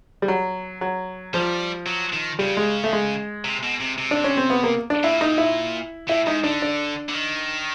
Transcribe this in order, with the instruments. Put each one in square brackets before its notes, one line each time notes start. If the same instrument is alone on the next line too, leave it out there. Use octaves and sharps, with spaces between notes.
[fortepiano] G3
F#3
F#3
[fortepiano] F3 [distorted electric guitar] G3
[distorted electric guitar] F#3
D#3
[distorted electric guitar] C#3 [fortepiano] G3
[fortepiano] G#3
A3
G#3
[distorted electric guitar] C3
B2
C3
C3
[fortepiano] D4
C#4
C4
B3
A#3
D4
[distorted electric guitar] A#2 [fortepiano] E4
[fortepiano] D#4
E4
[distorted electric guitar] A2 [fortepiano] E4
[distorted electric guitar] G#2 [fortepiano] D#4
[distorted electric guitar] D3 [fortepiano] D4
[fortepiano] D4
[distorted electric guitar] D3
D#3